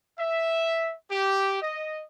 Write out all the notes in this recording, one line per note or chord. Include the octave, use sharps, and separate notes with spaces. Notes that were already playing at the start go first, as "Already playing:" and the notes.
E5
G4
D#5